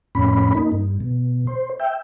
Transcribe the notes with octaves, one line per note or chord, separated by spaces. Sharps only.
F2 A2 C#4 B5
A#3 D#4
G2
B2
C5
E5 G5